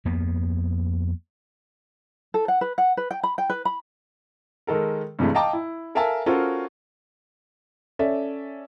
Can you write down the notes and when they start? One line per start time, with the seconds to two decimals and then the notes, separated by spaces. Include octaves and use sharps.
0.05 F2 A#3 B3
2.34 A4
2.48 F#5
2.61 B4
2.78 F#5
2.97 B4
3.11 G5
3.23 B5
3.38 G5
3.50 B4
3.65 B5
4.67 D#3 G#3 A4 A#4
5.19 G2 C3 E3 G#3 A3
5.35 D#5 F5 G5 A5 A#5 D6
5.53 E4
5.95 A4 A#4 E5 F5 G#5 A5
6.26 C#4 F4 F#4 A4 A#4 C5
7.99 C#4 A4 D5 E5